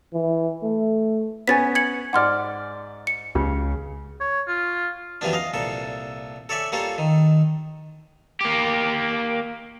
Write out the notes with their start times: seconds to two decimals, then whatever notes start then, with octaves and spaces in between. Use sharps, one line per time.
0.14 E3
0.63 A3
1.48 B3 C#4 G#5 A6 B6
1.75 G#6 C#7 F#7
2.13 G#2 D5 F#5 C6 F6
3.07 C#7
3.35 C#2 C#3
4.21 C#5
4.47 F4
5.21 F#2 E3 F3 G3 B3 D4
5.33 D#5 F5
5.54 C2 A#2 A4
6.49 A4 C#5 D5 E5 G#5
6.72 G3 A#3 F4 A4 C#5
6.98 D#3
8.40 A#3 G4